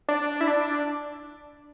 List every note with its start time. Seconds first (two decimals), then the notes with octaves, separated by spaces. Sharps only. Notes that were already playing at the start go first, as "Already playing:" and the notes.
0.09 D4
0.41 E4
0.48 D4